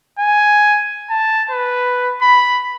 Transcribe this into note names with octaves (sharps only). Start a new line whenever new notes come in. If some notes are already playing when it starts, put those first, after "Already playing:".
G#5
A5
B4
B5